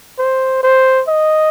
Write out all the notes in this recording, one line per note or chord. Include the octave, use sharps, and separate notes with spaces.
C5
C5
D#5